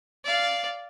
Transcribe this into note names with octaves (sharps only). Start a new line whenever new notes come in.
D5 F5